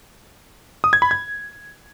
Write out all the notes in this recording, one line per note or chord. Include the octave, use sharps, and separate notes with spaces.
D#6
G#6
B5
G#6